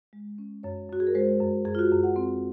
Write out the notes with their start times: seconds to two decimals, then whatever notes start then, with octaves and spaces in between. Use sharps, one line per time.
0.13 G#3
0.38 C#4
0.63 F#2 C#5
0.89 F#2 F#4
1.00 G#4
1.07 A#4
1.15 G#3 C5
1.40 F#2
1.65 F#2 G#4
1.75 F4
1.79 F#4
1.92 F#2 G#4
2.03 F#5
2.16 C4